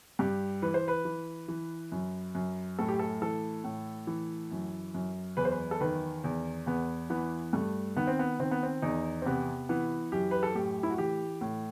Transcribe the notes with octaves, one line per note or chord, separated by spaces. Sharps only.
G2 G4
E3 B4
C5
B4
E3
E3
F#2
F#2
A2 A4
G4
A4
E3 A4
A2
E3
F#2
F#2
E2 B4
C5
B4
A4
D#3 B4
E2
E2 B3
E3 B3
G2 A3
D#3 B3
C4
B3
D#3 C4
B3
C4
E2 D#4
C4
C3 B3
E3 B3
F#2 G4
B4
A4
A2 G4
E4
F#4
E3 G4
A2